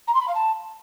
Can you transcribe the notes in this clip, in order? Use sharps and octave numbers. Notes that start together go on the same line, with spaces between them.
A#5
C6
B5
F5
A5